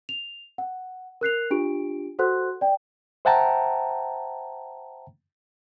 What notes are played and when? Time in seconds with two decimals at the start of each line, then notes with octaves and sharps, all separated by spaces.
0.09 F7
0.58 F#5
1.21 A#4 F#6 C7 F7
1.51 D4 F4 G4 D7
2.19 F#4 A4 C5 F#5 C6 F#6
2.61 D5 G5
3.25 C5 E5 F#5 G5 A5 A#5